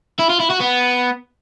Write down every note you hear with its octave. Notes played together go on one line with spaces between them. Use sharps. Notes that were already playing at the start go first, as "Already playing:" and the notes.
E4
F4
E4
F#4
B3